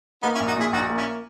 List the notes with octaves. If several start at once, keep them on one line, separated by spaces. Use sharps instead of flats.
A#3 B3 D#4
C#4 E4
A#1
D#4 F#4
A#2 E4 G#4
A#1 D#4 F#4
A#3
C#4 E4